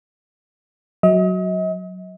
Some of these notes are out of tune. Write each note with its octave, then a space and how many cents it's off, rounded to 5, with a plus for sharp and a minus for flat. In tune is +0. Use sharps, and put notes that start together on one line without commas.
F#3 +0 D#5 +40